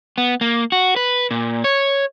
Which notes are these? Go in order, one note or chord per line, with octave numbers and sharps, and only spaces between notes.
B3
A#3
F#4
B4
A#2
C#5